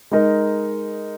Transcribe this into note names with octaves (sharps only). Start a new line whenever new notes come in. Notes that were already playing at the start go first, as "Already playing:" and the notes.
G#3 D#4 A#4 D#5